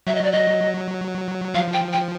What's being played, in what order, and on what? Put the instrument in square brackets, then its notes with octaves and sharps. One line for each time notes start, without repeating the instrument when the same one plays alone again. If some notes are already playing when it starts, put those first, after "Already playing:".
[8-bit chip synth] F#3 [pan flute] E5
[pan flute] D#5
D5
D#5
[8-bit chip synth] F3 [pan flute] F5
[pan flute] G5
G5